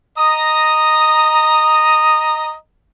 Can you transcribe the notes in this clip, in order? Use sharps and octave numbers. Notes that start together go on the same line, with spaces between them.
D#5 A#5 D#6